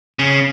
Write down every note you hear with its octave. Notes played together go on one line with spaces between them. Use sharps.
C#3